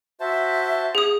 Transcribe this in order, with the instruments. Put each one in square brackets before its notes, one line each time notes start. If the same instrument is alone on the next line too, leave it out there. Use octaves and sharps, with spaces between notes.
[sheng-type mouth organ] F#4 C5 A5 [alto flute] E5
[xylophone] G#4 D#6